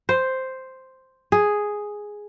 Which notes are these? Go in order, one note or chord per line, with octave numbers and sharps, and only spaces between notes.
C5
G#4